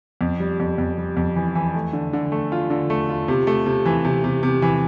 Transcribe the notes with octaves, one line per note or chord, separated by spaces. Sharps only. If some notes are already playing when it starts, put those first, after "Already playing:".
F2
G3
F2
F2
G3
F2
E3
E3
A3
D3
D3
A3
F4
D3
A3
F4
C3
A3
C3
E3
C3
C3
C3
E3